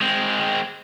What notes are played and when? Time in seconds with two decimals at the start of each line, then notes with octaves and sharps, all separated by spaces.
0.01 G#3 C4